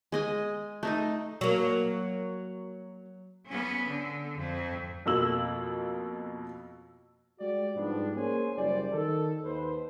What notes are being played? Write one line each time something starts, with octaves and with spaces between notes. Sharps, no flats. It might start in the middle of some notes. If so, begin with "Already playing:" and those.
G#3 D#5 G#5
A3 D#4 D#5
F#3 A#3
B3 C#4
D3
F2
F2 B2 A#3 E6 F#7
G#3 F#4 G4 D5
G#2 F3 G3 B3 D4
A#3 C#4 G#4 C5 G#5
F#1 G3 C5 D5
D#3 A4
D#2 B4 C5